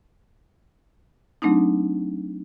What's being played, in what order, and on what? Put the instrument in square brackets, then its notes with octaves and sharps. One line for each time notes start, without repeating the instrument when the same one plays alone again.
[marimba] F#3 A3 C4 D4 D#4